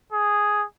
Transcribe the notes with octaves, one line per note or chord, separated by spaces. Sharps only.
G#4